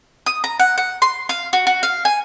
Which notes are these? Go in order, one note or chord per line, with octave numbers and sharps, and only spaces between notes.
D#6
A#5
F#5
F#5
C6
F5
F#4
F#4
F5
G#5